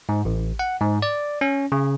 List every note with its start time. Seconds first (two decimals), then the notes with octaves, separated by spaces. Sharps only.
0.09 G#2
0.25 A1
0.59 F#5
0.81 G#2
1.02 D5
1.41 C#4
1.72 C#3